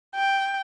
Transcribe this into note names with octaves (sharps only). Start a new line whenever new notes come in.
G5